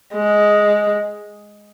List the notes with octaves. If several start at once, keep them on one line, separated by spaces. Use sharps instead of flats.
G#3